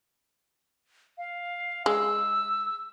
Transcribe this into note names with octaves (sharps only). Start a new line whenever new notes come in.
F5
G#3 E6